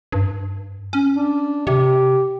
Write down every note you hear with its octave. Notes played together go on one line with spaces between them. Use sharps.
G2
C#4
D4
C3 G4